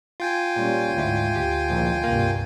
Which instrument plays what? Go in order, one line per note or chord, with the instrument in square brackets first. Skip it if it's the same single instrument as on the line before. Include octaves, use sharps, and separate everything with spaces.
[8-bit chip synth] F4 G5 G#5
[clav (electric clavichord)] A#2 [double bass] G3 C#4
[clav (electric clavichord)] D2 E4 [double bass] G#2
[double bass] D2 [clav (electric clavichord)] G4
[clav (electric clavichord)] A#1 D#2 A2
[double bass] C2 G2 [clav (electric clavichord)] A#3